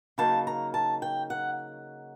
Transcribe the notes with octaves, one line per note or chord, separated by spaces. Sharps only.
C#3 F#3 A#3 D#4 A5
A#5
A5
G5
F#5